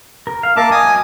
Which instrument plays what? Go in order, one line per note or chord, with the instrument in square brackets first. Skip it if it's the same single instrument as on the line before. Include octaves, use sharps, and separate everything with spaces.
[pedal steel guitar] A#4
F5
[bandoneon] A#3 A5 D6 [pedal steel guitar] A#4 E5
[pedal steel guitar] D#5 [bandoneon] G#5 D#6
[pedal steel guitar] F#3